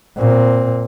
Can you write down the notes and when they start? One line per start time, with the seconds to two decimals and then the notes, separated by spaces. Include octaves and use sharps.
0.17 A#2 C4